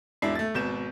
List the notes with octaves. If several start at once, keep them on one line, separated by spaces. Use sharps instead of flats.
E1 G#2 D4 E4 C7
A3 A6
G#1 B2 G6 E7